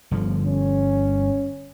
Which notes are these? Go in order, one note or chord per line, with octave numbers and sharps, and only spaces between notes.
G1 D3 F3
C#4